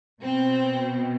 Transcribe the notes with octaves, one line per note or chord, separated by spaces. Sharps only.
B2 C4